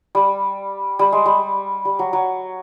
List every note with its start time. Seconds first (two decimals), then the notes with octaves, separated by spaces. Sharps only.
0.15 G3
0.99 G3
1.12 G#3
1.26 G3
1.85 G3
1.99 F#3
2.13 F#3